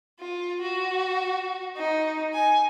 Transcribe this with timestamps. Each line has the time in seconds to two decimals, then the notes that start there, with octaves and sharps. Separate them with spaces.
0.19 F4
0.61 F#4
1.76 D#4
2.33 G#5